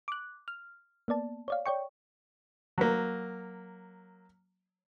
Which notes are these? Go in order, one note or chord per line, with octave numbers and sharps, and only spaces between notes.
D6 F#6
F6
A#3 B3 D5 A5
C#5 D5 F5
C#5 D5 G5 C#6
F#3 A#3